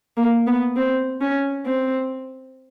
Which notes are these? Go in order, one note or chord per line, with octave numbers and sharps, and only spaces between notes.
A#3
B3
C4
C#4
C4